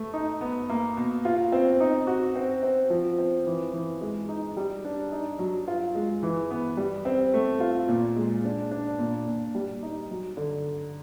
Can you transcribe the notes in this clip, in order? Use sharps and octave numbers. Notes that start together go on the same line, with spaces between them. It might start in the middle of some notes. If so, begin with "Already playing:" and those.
Already playing: A3
D#4
B3
A#3
B2
F4
C4
D#4
F#4
C4
C4
F3
C4
E3
E3
G#3
D#4
G3
D4
D#4
F#3
F4
G#3
E3
B3
G3
C4
A3
F4
A#2
G#3
D4
D4
A#2
A#2
G3
D#4
F#3
D3